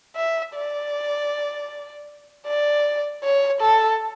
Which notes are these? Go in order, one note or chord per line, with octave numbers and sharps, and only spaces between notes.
E5
D5
D5
C#5
A4